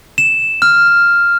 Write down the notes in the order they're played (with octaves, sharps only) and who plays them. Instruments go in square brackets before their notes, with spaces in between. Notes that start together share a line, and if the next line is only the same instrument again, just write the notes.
[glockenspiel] E7
F6